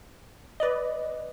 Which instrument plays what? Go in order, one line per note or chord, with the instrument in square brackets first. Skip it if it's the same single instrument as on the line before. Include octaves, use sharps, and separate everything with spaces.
[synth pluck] B4 D5 D#5